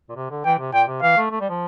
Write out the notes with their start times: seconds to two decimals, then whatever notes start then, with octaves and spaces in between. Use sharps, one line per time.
0.09 A#2
0.16 C3
0.31 D3
0.45 E3 G5
0.59 C3
0.73 A#2 G5
0.87 C3
1.02 E3 F5
1.17 A3
1.31 A3
1.41 G3
1.50 F3